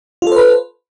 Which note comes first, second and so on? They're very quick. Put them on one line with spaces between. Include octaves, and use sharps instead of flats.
F4 A4 C5 B4